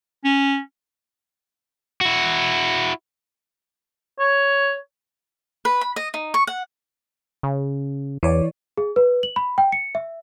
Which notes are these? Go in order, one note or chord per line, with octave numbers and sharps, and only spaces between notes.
C#4
E4 F#4
C#5
B4
B5
D#5
D#4
C#6
F#5
C#3
E2 E3 C#5 D5
G#4
B4
F#7
B5
G5
C#7
E5